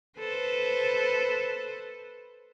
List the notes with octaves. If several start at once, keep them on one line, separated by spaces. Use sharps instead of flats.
A4 B4 C5